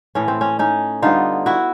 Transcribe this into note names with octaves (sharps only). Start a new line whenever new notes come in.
A2 E3 A3 C#4
C4
C#4
C#4 D#4
D3 G3 B3 D#4 F4
E4 F#4